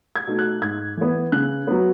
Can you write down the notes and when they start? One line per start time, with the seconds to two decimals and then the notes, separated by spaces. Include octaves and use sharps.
0.16 G#6
0.27 B2 A3 D#4
0.39 F#6
0.61 G#2 G#6
0.97 E3 B3
1.32 C#3 F#6
1.67 F#3 B3